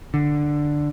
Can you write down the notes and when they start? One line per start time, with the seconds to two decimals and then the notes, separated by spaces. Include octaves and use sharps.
0.14 D3